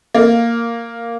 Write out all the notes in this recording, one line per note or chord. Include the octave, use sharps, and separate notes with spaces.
A#3